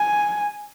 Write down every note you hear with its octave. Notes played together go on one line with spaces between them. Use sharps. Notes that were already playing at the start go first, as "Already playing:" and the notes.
Already playing: G#5